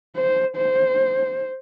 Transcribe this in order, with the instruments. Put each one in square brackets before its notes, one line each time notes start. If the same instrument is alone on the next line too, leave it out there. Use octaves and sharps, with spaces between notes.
[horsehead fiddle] C5
C5